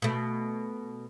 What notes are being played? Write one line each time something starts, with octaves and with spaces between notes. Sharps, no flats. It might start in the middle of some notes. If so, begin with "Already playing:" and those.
B2 A3